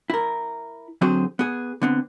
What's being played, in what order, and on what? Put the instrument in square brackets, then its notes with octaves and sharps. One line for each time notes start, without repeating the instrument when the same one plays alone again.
[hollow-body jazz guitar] E4 A#4
D3 F#3 C4 F#4 G#4 C5
B3 G#4
D3 B3 C4